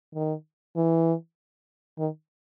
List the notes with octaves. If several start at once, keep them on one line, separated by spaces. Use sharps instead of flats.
D#3
E3
D#3